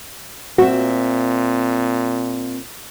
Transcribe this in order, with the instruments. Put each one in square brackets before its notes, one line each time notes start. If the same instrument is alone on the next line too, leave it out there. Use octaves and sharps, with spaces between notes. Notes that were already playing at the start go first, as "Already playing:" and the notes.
[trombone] A#2 [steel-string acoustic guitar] C4 E5 [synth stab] F#4